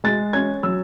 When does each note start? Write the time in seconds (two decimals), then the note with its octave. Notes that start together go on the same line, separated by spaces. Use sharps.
0.04 G#3 A6
0.33 C#4 G#6
0.63 F#3 E6